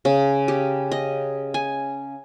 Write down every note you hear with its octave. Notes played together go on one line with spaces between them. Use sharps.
C#3
G4
D#5
G#5